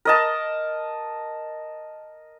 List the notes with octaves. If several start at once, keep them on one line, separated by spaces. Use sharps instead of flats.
A#4 D#5 A5